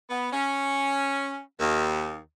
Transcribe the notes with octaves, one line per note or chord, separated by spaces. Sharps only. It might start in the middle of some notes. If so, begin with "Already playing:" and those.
B3
C#4
D#2